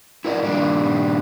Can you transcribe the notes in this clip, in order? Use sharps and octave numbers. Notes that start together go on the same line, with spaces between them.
E4 A#4 D5 D#5
G2 A#2 D#3 G3 D4